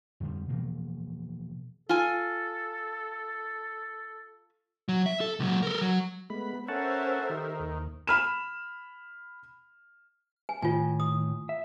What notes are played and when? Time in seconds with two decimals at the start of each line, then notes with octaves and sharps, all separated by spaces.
0.20 F2 D3 G3
0.49 B2 E3 F3 A#3
1.89 F4 A4 G#5
4.89 F#3
5.06 E5
5.21 A4
5.40 C#2 F#3
5.63 A4 A#4
5.81 F#3
6.30 G#3 A3 B3 B5
6.68 C#4 A4 A#4 C5 E5 F#5 A5
7.30 D#3 G4
7.60 D#2
8.07 B5 F6 E7
10.49 G#5
10.62 A2 D#3 F4 G#5
11.00 D#6
11.49 E5